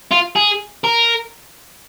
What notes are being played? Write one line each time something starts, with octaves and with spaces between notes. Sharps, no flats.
F4
G#4
A#4